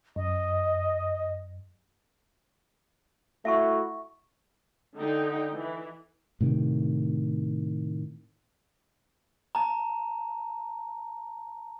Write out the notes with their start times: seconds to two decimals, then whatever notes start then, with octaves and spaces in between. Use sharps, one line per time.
0.16 F#2 D#5
3.45 A3 E4 F#4 E5 A5 C#6
4.97 D3 D#4 G5
5.54 E3
6.41 A2 C3 D#3
9.55 A5 A#5